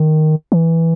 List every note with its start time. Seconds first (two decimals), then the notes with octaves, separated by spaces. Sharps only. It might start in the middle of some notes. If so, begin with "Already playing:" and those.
Already playing: D#3
0.52 E3